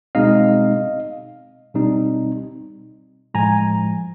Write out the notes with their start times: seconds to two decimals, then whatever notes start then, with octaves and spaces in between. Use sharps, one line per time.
0.15 B2 G#3 C4 D#4 D#5 F5
1.74 B2 G3 C4 D#4
3.34 A2 F3 G#3 G#5 A#5